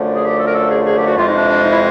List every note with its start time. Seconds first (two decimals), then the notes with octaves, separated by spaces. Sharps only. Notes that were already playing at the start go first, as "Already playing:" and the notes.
Already playing: F#2 D3 F3 A3
0.14 G#4
0.24 G4
0.39 A4
0.47 A#4
0.55 A4
0.71 G#4
0.86 G#4
0.97 G4
1.07 F#4
1.17 F2 C3 E3 G#3 F4
1.28 D#4
1.37 D4
1.49 D4
1.64 D#4
1.72 E4